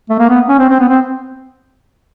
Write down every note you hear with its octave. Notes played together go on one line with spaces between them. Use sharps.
A3
A#3
B3
C#4
C4
C4
B3
C4